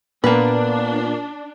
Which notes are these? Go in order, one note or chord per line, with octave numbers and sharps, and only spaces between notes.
A#2 A#3 B3 D4 B4